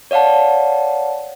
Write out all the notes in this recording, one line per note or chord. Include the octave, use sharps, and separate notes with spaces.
C#5 D5 F5 F#5 A5